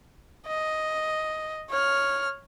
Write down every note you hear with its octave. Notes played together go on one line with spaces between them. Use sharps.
D#5
C#5 F6